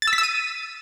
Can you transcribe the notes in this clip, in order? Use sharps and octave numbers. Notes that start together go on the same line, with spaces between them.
A6
E6
B6
E6
D#7